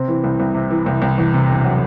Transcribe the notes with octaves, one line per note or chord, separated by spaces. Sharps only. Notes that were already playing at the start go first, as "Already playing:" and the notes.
Already playing: C3 C4
E3
C2
C2
C3
E3
C2
C2
E2
C3
E1
F#3